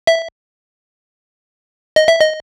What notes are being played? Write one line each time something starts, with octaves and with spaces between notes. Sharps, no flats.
E5
D#5
E5
D#5